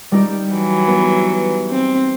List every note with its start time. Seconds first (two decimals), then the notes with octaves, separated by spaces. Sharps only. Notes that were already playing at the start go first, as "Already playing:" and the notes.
0.12 G3 D#4 G4
0.53 E3 F#3
0.88 B3
1.71 C4